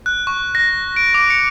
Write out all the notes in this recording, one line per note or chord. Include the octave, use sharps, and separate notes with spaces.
F#6
C#6
A#6
D7
D6
C#7